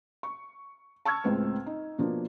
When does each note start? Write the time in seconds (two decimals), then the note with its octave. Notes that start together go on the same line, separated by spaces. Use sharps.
0.23 C#6
1.05 A5 C#6 E6 F6 G#6
1.24 C#2 A2 G#3 C4 B4
1.66 D#4
1.98 B2 F3 A#3 D4